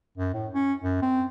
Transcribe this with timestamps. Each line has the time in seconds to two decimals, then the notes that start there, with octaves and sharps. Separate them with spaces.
0.17 F#2
0.34 A2
0.54 C#4
0.83 F#2
1.02 C4